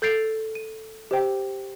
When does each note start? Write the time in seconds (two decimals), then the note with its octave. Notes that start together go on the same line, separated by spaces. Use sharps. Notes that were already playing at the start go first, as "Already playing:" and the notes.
0.02 A4 G6 A6 C7 D7 F7
0.55 D#7
1.11 G4 C5 G5